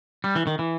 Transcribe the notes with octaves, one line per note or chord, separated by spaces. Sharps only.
G3
E3
D#3
E3